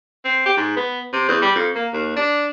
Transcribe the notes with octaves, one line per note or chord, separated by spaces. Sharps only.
C4
G4
G#2
B3
C3
E2
G3
F2
A#3
D#2
D4